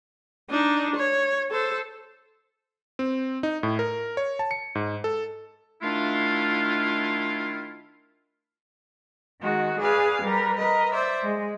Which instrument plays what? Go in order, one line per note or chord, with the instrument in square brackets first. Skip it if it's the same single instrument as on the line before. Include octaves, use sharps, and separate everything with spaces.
[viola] D4 D#4
C#5
A4 C5
[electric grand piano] C4
D#4
A2
A#4
C#5
A5
C#7
G#2
A4
[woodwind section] D#3 A3 D4 E4 F4
[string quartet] D#3 G#3 F#4
G#4 B4 D5 F5
G3 A#4 B4
A#4 B4 D#5
C5 D5 E5
G#3